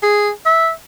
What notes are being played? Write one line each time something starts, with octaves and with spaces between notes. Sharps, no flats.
G#4
E5